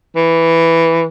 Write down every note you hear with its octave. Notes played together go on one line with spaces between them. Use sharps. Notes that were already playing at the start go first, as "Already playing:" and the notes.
E3